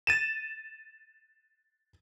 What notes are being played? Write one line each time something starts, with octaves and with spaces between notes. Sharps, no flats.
A6 D#7 E7